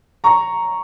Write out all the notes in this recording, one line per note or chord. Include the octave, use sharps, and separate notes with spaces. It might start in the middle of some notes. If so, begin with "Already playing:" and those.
A#5 C#6